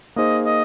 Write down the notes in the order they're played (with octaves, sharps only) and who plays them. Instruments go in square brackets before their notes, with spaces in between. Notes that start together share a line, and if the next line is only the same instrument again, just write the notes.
[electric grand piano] A#3 D#4 G#4 C5 [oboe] D#5
[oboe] D#5